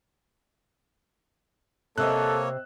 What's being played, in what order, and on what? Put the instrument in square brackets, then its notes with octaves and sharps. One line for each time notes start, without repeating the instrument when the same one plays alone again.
[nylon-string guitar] C3 C4 [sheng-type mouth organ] A#3 C#5 [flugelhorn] A4 [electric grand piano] D#5 E6 F#6